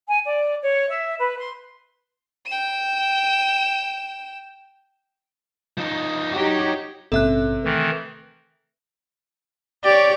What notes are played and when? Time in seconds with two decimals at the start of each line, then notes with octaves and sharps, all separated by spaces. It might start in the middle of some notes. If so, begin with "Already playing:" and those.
0.08 G#5
0.25 D5
0.63 C#5
0.89 E5
1.19 B4
1.38 C6
2.46 G5 E7
5.78 F3 D#4
6.33 D#4 F#4 G4 C#5
7.12 A#1 G#2 C3 C#4 A4 E5 F#6
7.65 D#3 E3 A3
9.84 G4 C#5 D5